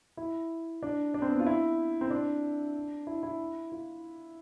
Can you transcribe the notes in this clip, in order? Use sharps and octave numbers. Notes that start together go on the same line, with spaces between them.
E4
D4
D4
C4
B3
F4
E4
C4
D4
E4
E4
F4